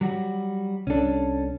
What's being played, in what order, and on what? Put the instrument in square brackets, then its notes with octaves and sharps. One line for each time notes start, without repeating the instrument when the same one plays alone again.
[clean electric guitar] F#3 G3 F#4
[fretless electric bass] C2 D4 [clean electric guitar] C#4 A4